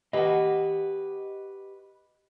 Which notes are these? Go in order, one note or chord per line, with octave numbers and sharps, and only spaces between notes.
F#4 G4 B4 D#5